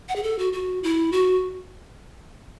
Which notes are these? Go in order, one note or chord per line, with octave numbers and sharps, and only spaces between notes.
F#5
G#4
A4
F#4
F#4
E4
F#4